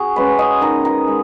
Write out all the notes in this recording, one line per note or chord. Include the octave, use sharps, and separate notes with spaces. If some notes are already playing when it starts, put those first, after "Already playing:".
Already playing: F#4 G#4
G#3 C#4 B4
D#5
D#3 A#5
A#5
G#3